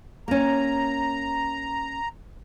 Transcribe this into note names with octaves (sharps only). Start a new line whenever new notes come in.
A#3 C#4 A#5